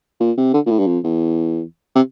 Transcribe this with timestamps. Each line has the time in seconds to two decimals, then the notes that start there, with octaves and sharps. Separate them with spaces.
0.20 A#2
0.38 C3
0.54 D3
0.66 A#2
0.71 A2
0.80 G2
0.87 F2
1.04 E2
1.95 C3